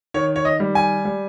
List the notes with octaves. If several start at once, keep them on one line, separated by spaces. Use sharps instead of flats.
D#3 C#5
C#5
D#5
G3
G#5
G3